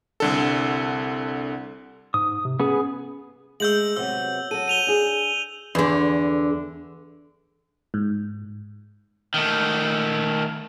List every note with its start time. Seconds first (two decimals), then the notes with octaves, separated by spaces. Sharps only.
0.20 C2 D3 A4
2.14 G#2 D#6
2.45 C3
2.60 B3 C#4 G#4
3.60 G#3 A3 E6 G6 F#7
3.96 C3 F#3 B3 E6
4.51 F#3 A4 D#7
4.68 D#7 F7 G7
4.87 D4 G#4
5.75 E2 D3
7.94 G#2
9.34 D#3 A3